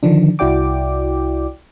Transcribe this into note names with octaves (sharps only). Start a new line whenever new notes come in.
D3 D#3 F3 D4
C2 E4 F#4 D5 G5 D6